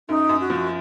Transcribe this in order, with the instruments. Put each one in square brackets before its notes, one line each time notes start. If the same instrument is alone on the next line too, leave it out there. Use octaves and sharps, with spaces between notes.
[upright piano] F#2 [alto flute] D#4
[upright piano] F#2
[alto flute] F#4
[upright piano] F3